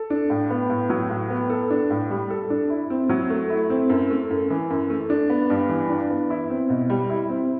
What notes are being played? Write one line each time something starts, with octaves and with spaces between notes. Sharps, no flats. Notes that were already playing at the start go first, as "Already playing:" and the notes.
Already playing: A4
D4
A2
B3
A2
F#3
A2
B3
A4
D4
A2
G3
A4
D4
E4
C4
F#3
A3
E4
C4
F#2
A3
F#2
E3
F#2
A3
D4
B3
G2
E3
D4
B3
E4
C4
B2
G3
E4
C4